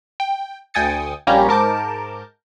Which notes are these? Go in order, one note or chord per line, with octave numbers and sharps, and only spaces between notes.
G5
D2 G5 G#5 D#6 A6 C#7
A#1 G3 A#3 C#4 G4 A#5
G#2 A#4 A5 D6 G6